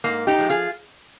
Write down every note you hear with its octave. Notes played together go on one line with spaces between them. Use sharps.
G#2 A#3
D#4 G4
F3 G#3
F4 G#4